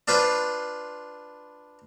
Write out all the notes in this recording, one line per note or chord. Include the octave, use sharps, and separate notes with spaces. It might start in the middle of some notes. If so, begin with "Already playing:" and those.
D4 F4 B4 C5